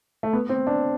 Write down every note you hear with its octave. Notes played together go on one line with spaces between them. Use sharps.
A3
B3
C4
D4